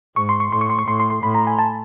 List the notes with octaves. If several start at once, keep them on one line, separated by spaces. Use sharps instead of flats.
G#2 C#6
C6
C#6
A2 C6
C#6
C6
C#6
A2 C6
C6
C6
A2 B5
A#5
G#5
A5